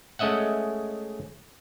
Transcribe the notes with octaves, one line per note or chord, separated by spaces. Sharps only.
G#3 A3 C#4 D#5 E5 F#5